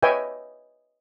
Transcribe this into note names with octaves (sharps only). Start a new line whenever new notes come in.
B4 C#5 D#5 E5 G5 G#5